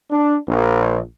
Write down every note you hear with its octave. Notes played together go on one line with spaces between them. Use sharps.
D4
A#1